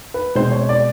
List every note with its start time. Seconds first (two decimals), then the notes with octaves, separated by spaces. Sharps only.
0.14 B4
0.35 B2 G#3 C4 C5
0.52 C#5
0.69 D5